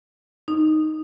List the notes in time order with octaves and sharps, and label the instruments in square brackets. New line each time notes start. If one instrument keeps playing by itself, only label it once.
[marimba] D#4